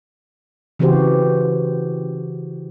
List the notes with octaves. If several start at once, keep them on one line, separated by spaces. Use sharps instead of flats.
C#3 E3 C4 F#4 G4 C5